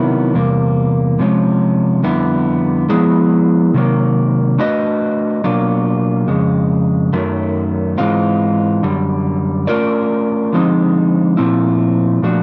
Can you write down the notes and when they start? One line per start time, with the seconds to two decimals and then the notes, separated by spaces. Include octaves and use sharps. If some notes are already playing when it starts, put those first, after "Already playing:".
Already playing: C3 D#3 F#3 B3 E4
0.34 E2 C3 G3 A#3
1.19 C3 F3 G#3 C#4
2.03 F2 D3 G3 B3 E4
2.89 F3 G#3 B3 E4 G#4
3.74 C3 D#3 F#3 A#3
4.58 A3 D4 F#4 B4 D#5
5.44 B2 F#3 A#3 D4 F4
6.28 F2 C#3 G#3
7.13 F#2 D#3 F#3 A3
7.98 G#2 E3 G#3 C4 F4
8.83 F#2 D3 G3
9.67 A3 C#4 F4 A#4 D5
10.53 D3 F3 G#3 C4 D#4
11.37 A#2 F3 A3 C4 E4
12.22 A#2 F3 A3 D4 F#4